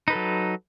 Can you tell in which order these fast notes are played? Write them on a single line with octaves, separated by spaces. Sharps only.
D#4 B4 A4 F#3